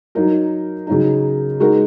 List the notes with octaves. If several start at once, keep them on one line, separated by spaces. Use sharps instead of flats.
F#3 D#4 A#4
C#3 F#3 D#4
G#3 D#4 F#4 A#4